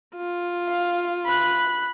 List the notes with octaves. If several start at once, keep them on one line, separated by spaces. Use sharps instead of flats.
F4
F5
B5 F#6